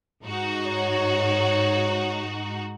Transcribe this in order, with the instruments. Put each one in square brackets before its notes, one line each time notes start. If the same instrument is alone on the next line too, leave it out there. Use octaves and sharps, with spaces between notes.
[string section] G#2 D#4 F#4
[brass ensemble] C#5